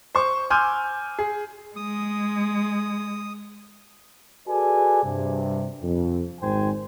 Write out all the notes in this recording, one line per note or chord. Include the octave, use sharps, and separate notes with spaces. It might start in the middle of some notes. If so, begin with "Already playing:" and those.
C5 C#6
G#5 C6 D6 E6 F6 G6
G#4
G#3 D#6
F#4 G#4 A4 B4 D5 G#5
G2 C3
F2
G#1 G#2 C5 G5 G#5